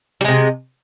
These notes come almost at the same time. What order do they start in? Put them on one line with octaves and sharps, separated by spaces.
G3 G#3 C3